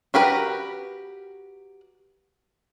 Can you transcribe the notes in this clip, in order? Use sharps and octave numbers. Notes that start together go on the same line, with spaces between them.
F#4 G4 A#4 B4